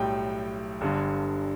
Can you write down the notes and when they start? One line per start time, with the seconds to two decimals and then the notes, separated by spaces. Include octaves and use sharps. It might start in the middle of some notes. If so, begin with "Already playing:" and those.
Already playing: B1 A2 G3 G5
0.81 G1 G2 D3